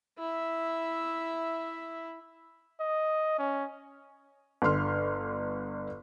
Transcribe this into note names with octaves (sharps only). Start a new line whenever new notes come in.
E4 E5
D#5
C#4
G1 D3 C6 F6